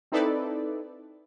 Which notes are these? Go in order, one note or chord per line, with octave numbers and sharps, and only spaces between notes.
C4 D#4 E4 A4 B4 D5